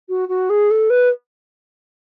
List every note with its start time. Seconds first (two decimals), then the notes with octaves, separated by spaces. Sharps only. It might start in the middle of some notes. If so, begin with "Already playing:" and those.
0.09 F#4
0.28 F#4
0.49 G#4
0.70 A4
0.90 B4